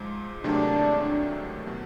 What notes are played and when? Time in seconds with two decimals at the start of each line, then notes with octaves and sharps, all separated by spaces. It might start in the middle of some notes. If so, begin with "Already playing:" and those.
Already playing: G#2 F3 G#3
0.44 C2 C3 D#3 F#3 A3 D4
1.67 B2 F#3